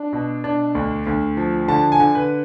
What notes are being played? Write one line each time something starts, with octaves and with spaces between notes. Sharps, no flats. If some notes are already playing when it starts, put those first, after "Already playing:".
Already playing: D4
B2
D4
D2
D2
F3
D3 A5
G#5
D3
B4